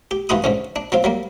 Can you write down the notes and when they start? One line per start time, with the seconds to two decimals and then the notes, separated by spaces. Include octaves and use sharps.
0.11 G4
0.29 G2 E3 F4 F#4 B5 D#6
0.44 G#2 D3 C#4
0.76 D4
0.92 F#3 C4 F4
1.04 F#3 G3 A#3